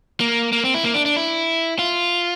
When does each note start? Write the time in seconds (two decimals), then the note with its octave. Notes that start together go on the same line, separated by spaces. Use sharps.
0.20 A#3
0.53 A#3
0.64 C4
0.74 E4
0.84 A#3
0.94 D4
1.05 D4
1.16 E4
1.79 F4